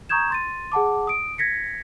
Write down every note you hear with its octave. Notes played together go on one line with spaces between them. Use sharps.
A#5 C#6 D#6 G6 G#6 E7
C6 A6 D#7
G#4 F#5 A5 D6
D#6 D7
G#6 A#6 B6 C#7